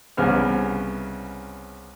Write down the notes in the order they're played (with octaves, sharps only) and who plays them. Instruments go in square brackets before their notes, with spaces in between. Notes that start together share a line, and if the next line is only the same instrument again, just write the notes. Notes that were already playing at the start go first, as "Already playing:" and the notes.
[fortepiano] C2 C#3 B3 F6